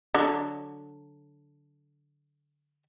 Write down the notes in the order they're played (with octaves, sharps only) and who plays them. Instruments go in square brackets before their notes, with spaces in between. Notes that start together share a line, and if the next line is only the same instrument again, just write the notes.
[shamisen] D3 F#3